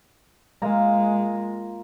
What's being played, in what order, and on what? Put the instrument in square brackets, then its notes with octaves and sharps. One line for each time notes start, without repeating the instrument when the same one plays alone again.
[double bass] G#3 [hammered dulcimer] A#3 F4 A#5